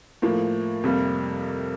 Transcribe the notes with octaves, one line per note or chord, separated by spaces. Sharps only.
A2 F3 A#3
F2 C3 G3 A#3